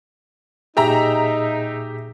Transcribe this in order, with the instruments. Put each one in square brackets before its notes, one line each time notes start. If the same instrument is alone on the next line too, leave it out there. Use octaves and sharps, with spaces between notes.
[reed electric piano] A#2 G#4 [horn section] D#4 [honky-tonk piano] G4 E5 A#5